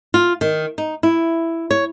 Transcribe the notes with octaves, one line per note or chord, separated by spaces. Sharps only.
F4
D#3
D#4
E4
C#5